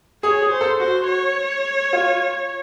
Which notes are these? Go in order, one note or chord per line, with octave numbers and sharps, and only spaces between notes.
G#4 C#5
G#4
C5
A4
F#4 C5
C#5
F4